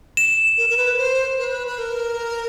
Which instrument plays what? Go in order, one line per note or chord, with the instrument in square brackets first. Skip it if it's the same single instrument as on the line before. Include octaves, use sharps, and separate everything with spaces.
[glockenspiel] E7
[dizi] A#4
A#4
B4
C5
B4
B4
A#4